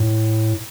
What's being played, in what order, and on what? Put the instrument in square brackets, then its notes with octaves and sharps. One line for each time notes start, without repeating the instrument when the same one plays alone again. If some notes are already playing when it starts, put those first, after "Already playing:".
Already playing: [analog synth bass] A2